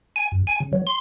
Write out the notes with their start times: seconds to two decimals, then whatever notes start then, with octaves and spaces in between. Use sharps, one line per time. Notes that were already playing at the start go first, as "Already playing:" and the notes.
0.16 G#5
0.32 F#2
0.47 G#5
0.60 C#3
0.73 F#3
0.87 C6